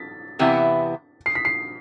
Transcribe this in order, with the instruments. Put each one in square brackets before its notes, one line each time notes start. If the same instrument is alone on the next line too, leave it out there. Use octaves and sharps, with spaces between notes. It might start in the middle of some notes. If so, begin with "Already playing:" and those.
Already playing: [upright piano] A6 B6
[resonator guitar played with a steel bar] E2 C3 E3 B3 E4
[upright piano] C7
B6
C7